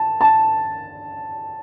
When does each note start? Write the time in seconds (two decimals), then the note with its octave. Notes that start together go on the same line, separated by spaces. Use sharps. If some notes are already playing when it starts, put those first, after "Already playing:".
Already playing: A5
0.21 A5